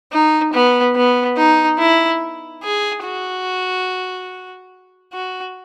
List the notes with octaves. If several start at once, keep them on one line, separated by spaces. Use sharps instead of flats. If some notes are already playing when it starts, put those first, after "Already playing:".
D#4
B3
B3
D#4
E4
G#4
F#4
F#4